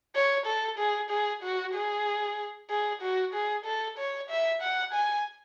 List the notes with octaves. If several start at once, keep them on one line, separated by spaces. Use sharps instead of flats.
C#5
A4
G#4
G#4
F#4
G#4
G#4
F#4
G#4
A4
C#5
E5
F#5
G#5